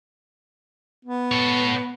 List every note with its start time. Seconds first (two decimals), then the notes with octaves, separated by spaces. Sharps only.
1.05 B3
1.32 A4 C#5